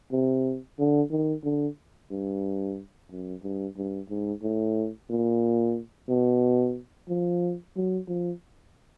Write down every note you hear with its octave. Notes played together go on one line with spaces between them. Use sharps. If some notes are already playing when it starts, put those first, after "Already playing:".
C3
D3
D#3
D3
G2
F#2
G2
G2
G#2
A2
A#2
B2
F3
F#3
F3